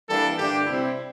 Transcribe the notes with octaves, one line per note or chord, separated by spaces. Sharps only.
E3 G3 A#3 D4 A4
G2 D3 A3 D4 G4
C3 G3 C4 E4